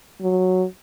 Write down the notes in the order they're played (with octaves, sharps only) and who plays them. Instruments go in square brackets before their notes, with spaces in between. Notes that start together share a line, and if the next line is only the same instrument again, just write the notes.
[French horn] F#3